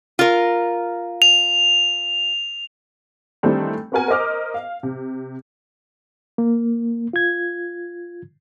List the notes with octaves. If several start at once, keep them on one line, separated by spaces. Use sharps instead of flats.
F4 A#4
F7
D#3 E3 G3 A3 C4 D4
B3 C4 F#4 A#4 F#5 G#5
A#4 C5 D#5 D6 F6
F5
C3
A#3
F4 G#6